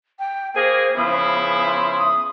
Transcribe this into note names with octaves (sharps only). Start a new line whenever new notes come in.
G5
A#3 G#4 C5
C#3 F3 B3 E4
C6
D#6